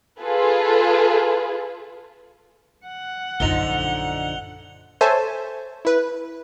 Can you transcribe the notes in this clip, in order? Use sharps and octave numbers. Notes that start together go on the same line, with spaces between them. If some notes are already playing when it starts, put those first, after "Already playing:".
F4 G#4 A4 B4
F#5
A#1 F#2 D3 F3 D#4 F7 G7
A4 C5 C#5 E5 G#5 A5
E4 B4